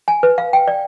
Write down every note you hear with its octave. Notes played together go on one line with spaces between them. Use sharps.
G#5
B4
F5
G5
D5